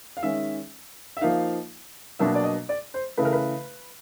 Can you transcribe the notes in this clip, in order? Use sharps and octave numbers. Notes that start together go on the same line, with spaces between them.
F5
D#3 G#3 C#4 E5
E5
F3 A#3 D#4 F5
B2 F#3 A#3 D4 E5
D5
D#5
D5
C5
C#3 E3 A3 B4
A#4
B4